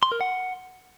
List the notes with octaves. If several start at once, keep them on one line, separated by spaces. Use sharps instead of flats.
C6
A#4
F#5